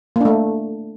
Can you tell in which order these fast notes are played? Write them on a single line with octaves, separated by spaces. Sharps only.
A#3 D4 A3